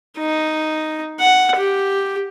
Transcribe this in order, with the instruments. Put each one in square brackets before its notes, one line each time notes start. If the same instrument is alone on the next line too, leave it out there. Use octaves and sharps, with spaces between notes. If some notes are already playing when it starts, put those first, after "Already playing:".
[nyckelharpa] D#4
F#5
G4